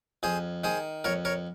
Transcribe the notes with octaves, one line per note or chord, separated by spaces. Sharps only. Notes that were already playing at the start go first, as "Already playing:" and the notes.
F2 G#4 C5
D#3 G#4 C5
F2 A#4 C#5
A#4 C#5